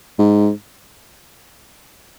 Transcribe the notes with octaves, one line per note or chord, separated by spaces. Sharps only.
G#2